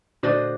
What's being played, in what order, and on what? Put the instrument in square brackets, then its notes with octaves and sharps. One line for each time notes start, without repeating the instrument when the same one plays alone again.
[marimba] A#2 D3 [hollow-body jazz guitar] A3 D4 F#4 C5 D#5